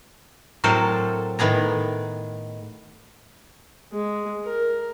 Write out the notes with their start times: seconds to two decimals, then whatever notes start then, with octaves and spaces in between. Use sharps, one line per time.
0.64 A2 F#3 C4 A4 A#4 C5
1.39 A2 D#3 B3 G#4 A#5
3.92 G#3
4.45 A#4